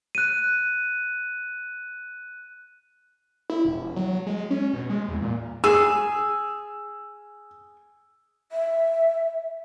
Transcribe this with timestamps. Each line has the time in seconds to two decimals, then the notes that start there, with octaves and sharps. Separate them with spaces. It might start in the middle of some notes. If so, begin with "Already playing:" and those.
0.15 F#6 D#7
3.50 E4
3.65 E1
3.96 F#3
4.27 G#3
4.51 C#4
4.73 B2
4.90 G#3
5.08 E2
5.22 A#2
5.64 G#4 E6
8.52 E5